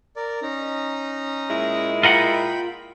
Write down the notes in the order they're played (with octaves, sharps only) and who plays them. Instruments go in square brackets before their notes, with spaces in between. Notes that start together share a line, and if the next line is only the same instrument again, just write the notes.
[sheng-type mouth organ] A#4 D5
C#4 D#4 A#5
[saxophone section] A#2 G#3 E4
[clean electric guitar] F4 A#4 F#5 [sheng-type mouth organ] G5 B5